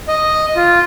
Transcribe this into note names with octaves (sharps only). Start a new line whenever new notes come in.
D#5
F4